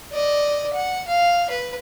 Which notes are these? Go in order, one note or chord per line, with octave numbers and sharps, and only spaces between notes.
D5 D#5
F#5
F5
B4